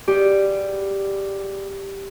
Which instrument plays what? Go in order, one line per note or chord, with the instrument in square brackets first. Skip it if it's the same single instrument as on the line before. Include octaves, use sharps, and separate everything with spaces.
[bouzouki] G3 G#3 B3 [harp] G4